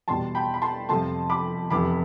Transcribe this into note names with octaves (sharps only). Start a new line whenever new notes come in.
E2 B2 G3 A5 C6
G5 B5
B5
A5 C6
F2 C3 F3 A3 A5 C6
B5 D6
F1 E2 C3 B5 D6